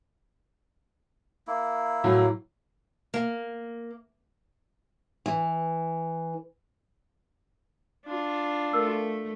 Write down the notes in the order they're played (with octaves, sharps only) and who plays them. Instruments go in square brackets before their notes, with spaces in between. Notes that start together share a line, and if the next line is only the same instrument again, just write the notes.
[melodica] A#3 E4
[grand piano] A2 F#3
[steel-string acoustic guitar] A#3
E3
[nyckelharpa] D4 F4
[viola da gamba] A3 [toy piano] A#4 E6